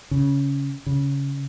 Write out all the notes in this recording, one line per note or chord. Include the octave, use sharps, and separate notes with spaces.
C#3
C#3